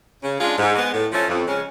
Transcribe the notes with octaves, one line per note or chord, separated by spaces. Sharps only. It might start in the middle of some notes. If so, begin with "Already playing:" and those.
C#3
G#3 D4 F4 G#4
G#2
G#3 B3
A2
F3 A3 C#4
F2
C#3 G#3 C#4